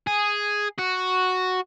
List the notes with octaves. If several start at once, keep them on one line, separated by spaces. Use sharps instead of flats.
G#4
F#4